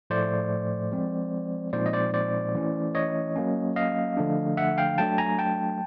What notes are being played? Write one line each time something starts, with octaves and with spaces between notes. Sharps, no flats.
A2 F3 A3 C5 D5
F3 G#3 C4
A#2 F3 G#3 C4 D#4 C5 D5
D#5
C5 D5
C5 D5
E3 A3 C#4 E4
C#5 D#5
F#3 A#3 C#4
D#5 F5
D3 F3 A3 D4
E5 F#5
F5 G5
F#3 A3 D4 G5 A5
G#5 A#5
G5 A5